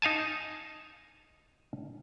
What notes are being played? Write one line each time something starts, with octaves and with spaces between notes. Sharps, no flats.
D#4 F5 G#5 A5